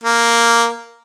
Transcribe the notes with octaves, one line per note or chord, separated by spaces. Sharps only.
A#3